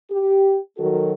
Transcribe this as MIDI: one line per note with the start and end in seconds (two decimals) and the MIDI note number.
0.11 0.58 67
0.78 1.13 51
0.78 1.13 54
0.78 1.13 66
0.78 1.13 69
0.78 1.13 70